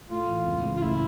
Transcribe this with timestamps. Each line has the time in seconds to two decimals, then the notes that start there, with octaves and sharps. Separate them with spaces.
0.10 A2 F4
0.28 E3
0.45 C#2
0.63 C#3
0.77 F4
0.82 A1 E4